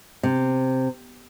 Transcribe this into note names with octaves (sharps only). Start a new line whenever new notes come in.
C3